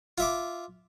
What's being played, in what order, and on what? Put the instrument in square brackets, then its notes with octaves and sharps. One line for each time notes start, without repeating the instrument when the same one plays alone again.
[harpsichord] F4 E5 D6